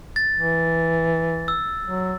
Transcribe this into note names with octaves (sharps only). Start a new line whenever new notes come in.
A6
E3
E6
F#3